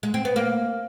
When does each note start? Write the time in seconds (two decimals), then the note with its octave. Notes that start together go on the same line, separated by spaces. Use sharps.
0.03 G#3
0.14 C4
0.25 B3
0.36 A#3